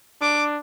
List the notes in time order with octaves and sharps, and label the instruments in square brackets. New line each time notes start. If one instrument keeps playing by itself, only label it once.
[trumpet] D4 [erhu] D6